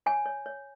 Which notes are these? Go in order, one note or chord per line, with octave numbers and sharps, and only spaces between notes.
C#5 G#5
C#5
C#5